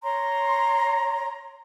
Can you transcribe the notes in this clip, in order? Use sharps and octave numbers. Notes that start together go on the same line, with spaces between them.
C#5 A#5 C6